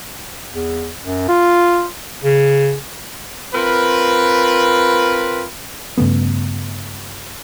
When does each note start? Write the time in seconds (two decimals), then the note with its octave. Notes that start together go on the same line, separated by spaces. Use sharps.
0.54 E2
1.03 F#2
1.28 F4
2.23 C#3
3.54 C4 F4 A#4 B4
5.98 G2 C#3 A3 B3